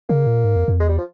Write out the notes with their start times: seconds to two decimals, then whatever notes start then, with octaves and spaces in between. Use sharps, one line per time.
0.09 C#3 A#3
0.27 A#2
0.45 G#2
0.56 F2
0.68 F2
0.80 E2 G#3
0.89 G3
0.98 F3